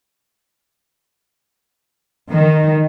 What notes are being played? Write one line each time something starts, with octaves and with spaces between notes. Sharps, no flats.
D#3